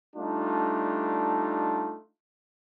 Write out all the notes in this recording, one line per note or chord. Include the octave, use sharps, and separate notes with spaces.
G3 A3 D4 D#4 F4